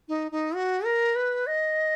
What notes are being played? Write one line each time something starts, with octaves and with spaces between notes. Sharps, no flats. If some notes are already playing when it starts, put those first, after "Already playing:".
D#4
D#4
F#4
A#4
B4
D#5